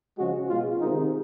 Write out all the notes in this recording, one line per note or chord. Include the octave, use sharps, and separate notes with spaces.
C#3 F3 G#3 F#4
B2 G#3 F4
C3 D#3 G#3 D#4